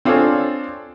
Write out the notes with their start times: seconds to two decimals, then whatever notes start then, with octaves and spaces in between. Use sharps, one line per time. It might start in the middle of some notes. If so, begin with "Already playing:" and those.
0.05 C4 D4 F4 G#4 A4 C#5